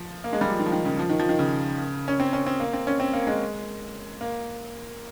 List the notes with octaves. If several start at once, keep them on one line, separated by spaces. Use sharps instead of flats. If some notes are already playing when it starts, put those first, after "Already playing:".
Already playing: F3
A#3
G#3
G3
F3
D#3
F3
D#3
C#3
F3
D#3
F3
D#3
C#3
C#4
C4
C#4
C4
A#3
C4
C#4
C4
A#3
G#3
A#3